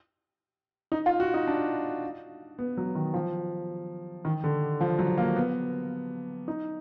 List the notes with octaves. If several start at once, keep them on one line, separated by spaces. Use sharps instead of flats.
D#4
F4
F#4
D#4
D4
B3
F#3
D#3
F3
D#3
D3
F3
F#3
A#3
B3
D#4